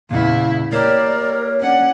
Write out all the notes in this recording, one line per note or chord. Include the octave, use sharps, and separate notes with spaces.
E2 A#2 C#3 E4 F5
A#3 E4 G4 A#4 C#5 D5
C#4 D4 F#5